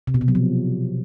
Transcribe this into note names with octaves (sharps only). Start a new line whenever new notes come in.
C3
B2
C3
F#3
F3